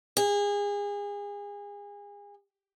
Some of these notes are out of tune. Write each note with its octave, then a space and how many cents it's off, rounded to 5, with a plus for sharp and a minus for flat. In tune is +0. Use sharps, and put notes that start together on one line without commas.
G#4 -30